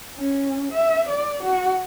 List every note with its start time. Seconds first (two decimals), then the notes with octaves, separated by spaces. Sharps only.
0.17 C#4
0.72 E5
1.10 D5
1.44 F#4